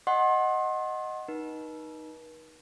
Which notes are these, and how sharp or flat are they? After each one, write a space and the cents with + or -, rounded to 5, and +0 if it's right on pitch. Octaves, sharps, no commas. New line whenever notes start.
D#5 +0 F#5 +0 C6 +35
D#4 +0 B4 -45